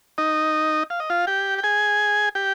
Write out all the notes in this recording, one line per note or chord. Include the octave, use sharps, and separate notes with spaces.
D#4 D#5
F5
D#5
F4 F5
G4 G5
G5
G#4 G#5
G4 G5